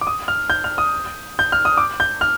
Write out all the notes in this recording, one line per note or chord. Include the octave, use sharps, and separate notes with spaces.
D6
D#6
F6
G6
F6
D#6
G6
F6
D#6
D6
G6
F6